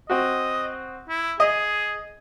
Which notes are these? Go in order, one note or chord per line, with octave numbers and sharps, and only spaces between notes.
C4 F#4 D#5
E4
G#4 D#5